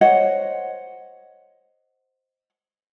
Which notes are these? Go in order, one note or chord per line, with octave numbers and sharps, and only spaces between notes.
C5 C#5 D#5 F#5